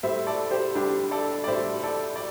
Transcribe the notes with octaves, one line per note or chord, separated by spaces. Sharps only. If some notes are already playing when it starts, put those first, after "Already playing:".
A2 G3 C5 E5
A4 D5
G4 C5
A2 G3 D4 G4
A4 D5
D5
A2 G3 C5 E5
A4 D5
D5